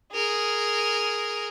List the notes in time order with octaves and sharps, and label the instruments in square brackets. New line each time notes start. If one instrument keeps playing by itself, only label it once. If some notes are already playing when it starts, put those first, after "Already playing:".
[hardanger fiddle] G#4 A#4